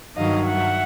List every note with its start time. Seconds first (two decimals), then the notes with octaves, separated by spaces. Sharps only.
0.15 G2 D#3 F#3 D#5 F5
0.45 E5 F#5